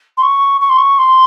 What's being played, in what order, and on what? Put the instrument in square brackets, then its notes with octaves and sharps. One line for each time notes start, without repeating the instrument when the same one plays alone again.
[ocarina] C6
C#6
C#6
C6
C#6
C6